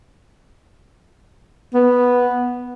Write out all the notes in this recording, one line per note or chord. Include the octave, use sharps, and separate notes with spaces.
B3